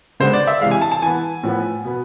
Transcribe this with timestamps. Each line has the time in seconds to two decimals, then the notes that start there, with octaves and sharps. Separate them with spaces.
0.20 D3 G#3 B3 C5
0.33 D5
0.47 E5
0.61 C3 E3 G#3 F5
0.71 G#5
0.81 A5
0.92 A5
1.02 E3 B3 G#5
1.43 A2 F3 B3
1.84 B2 B3